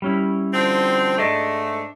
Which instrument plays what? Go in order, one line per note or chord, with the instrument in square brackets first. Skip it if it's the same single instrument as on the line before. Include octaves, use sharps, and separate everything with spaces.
[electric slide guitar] G3 C#4 E4
[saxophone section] D3 F3 C4
[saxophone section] G#2 A3 [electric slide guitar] D4 D#5